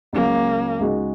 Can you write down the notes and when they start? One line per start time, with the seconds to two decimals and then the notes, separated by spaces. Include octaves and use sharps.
0.13 C#2 C#3 F#3 A#3 C#4
0.80 C#2 C#3 G#3 D#4 F#4